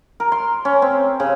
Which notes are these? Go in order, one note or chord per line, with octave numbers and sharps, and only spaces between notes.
A#4
C6
C#4
C4
C#3